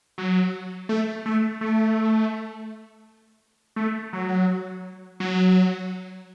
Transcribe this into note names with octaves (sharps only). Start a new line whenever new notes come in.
F#3
A3
A3
A3
A3
F#3
F#3